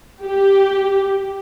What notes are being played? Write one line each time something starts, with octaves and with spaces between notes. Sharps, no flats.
G4